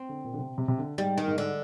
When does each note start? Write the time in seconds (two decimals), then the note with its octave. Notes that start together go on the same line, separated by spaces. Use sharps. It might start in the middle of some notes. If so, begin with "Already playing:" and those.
Already playing: C4
0.09 D3
0.24 A#2
0.33 D3
0.38 C3
0.58 C3
0.68 C3
0.78 D3
0.98 G#2 G3
1.18 D#3
1.28 G#2
1.38 D3